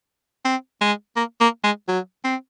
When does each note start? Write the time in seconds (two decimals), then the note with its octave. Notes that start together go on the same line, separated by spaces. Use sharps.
0.45 C4
0.81 G#3
1.16 A#3
1.41 A#3
1.64 G#3
1.88 F#3
2.25 C4